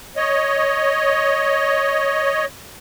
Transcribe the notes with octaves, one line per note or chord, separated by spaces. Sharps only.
C#5 D#5